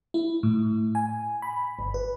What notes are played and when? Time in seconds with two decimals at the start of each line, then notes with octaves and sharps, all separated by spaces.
0.14 E4
0.43 A2
0.95 G#5
1.42 B5
1.79 G1
1.94 B4